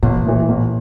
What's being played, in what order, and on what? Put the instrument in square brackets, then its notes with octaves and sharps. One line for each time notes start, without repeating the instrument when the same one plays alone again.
[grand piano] A1 [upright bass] A#2
[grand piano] A2 E3
A1